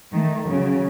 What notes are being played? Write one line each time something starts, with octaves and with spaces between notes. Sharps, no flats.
D#3 A3
C#3 F#3